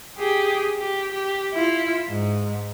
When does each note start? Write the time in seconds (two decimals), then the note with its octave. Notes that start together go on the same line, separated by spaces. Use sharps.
0.18 G4 G#4
0.78 G4
1.12 G4
1.54 E4 F4
2.08 G#2